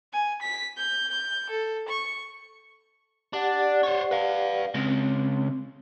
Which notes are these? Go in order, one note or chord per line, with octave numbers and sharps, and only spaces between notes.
G#5
B6
G6
G6
A4
C#6
D4 G4 D5 F#5
C5 C#5
B4 F5
C#3 G#3 C4